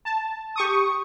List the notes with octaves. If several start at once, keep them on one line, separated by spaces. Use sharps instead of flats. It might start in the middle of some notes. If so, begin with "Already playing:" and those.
A5
G4 C#6 D#6